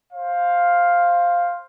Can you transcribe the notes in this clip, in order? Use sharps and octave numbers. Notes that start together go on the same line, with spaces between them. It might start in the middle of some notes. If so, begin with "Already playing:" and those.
C5 F5